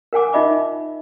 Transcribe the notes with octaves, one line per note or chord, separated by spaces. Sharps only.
A#4 F#5 G#5 D6
D#4 F4 D#5 E5 B5 D6